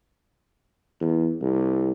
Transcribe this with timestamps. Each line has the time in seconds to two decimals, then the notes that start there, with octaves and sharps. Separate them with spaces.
1.01 E2
1.41 C2